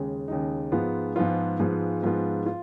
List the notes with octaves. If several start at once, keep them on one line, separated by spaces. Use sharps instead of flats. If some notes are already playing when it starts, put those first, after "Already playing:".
Already playing: D#2 C#3 G#3
D#2 C#3 G#3 D#4
G#2 F3 G#3 B3 F4
G#2 F3 G#3 B3 F4
G#2 F3 G#3 B3 F4
G#2 F3 G#3 B3 F4
F4